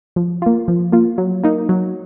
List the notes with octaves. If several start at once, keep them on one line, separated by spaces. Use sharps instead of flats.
F3
A#3 F4
F3
A#3 F4
F#3
A#3 D#4
F#3